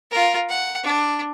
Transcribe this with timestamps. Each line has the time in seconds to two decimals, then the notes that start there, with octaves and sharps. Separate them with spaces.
0.11 F4 A#4
0.49 F#5
0.83 D4